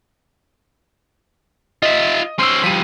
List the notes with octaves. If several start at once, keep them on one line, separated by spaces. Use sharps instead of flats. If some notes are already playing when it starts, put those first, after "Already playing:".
F4 D#5 E5
C#4 C5 C6 E6
F3 G3 B6 D#7